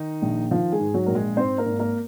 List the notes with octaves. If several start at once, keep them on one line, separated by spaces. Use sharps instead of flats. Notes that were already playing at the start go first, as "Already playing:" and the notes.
Already playing: D#3 D#4
A#1
D#3 F3 F4
G#3 G#4
G#2
F#3 F#4
A#1 A#4
G#3 G#4
G#2 C4 C5
A#3 A#4
G#1
A#3 A#4